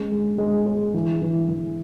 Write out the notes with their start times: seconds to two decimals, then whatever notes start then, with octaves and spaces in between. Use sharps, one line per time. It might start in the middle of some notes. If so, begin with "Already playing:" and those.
Already playing: G#3 C#4
0.11 G#3
0.38 G#3
0.66 G#4
0.94 E3
1.22 E3
1.49 E3